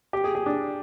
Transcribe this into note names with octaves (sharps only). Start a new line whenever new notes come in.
G4
G#4
G#4
D4